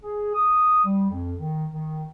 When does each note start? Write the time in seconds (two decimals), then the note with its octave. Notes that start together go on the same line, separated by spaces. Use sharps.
0.02 G#4
0.34 D#6
0.84 G3
1.09 F2
1.38 D#3
1.70 D#3